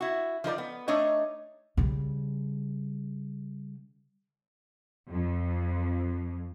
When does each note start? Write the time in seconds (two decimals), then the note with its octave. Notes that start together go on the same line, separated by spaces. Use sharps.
0.01 E4 F#4
0.44 F3 D#4 B4 D5
0.58 B3
0.88 A3 D4 D#4 C#5 D#5
1.77 C#3 G3
5.11 F2